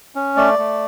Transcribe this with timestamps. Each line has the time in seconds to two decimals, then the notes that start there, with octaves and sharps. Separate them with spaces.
0.15 C#4
0.37 A3 D5
0.59 A3